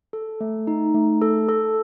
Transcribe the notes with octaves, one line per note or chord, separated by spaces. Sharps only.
A4
A3
D#4
A3
A4
A4